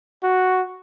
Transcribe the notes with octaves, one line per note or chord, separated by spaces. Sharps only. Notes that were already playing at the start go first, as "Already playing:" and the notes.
F#4